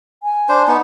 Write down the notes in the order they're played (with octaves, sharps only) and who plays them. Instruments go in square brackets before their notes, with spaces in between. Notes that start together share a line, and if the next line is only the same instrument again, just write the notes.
[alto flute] G#5
[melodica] D4 C5
B3 D#4